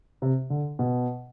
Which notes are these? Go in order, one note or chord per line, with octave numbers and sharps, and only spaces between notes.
C3
D3
B2